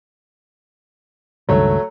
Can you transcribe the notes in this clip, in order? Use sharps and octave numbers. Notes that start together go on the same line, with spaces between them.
C#2 G2 D#3 F#3 A3 C#5